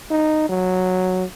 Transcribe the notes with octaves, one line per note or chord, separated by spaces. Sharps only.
D#4
F#3